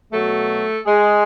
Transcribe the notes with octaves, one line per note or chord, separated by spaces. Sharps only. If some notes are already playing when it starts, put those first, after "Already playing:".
B2 F#3 A3 A4
G#3 G#4